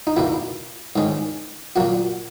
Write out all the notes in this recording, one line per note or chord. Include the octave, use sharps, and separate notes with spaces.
D#4
E2 B2 A#3 E4
G#2 D#3 G#3 C#4
A#2 F#3 A#3 F#4